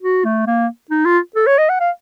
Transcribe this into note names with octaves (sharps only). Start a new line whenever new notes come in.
F#4
A3
A#3
D#4
F4
A4
C#5
D#5
F#5
F5